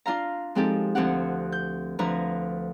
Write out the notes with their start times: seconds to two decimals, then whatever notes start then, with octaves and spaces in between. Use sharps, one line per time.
0.06 D4 F4 F5 A#5
0.55 F3 G#3 C4 D#4 G4 A4
0.95 D2 F3 C4 G4 F#5
1.52 G6
1.99 D2 F3 D4 B4 A#5